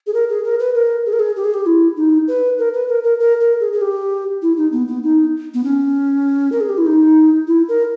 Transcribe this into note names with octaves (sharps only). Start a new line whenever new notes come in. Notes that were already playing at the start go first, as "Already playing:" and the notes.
G#4
A#4
G#4
A#4
B4
A#4
G#4
A#4
G#4
G4
G#4
G4
E4
D#4
B4
A#4
B4
A#4
A#4
A#4
A#4
G#4
G#4
G4
E4
D#4
B3
B3
D#4
B3
C#4
A#4
G#4
G4
E4
D#4
E4
A#4